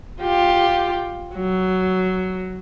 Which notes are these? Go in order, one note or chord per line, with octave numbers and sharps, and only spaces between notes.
F4 G4
F#3